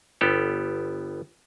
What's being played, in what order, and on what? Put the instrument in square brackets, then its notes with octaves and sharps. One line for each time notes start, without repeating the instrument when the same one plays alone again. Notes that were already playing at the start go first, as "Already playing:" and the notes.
[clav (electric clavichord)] G1 B3 G4 A4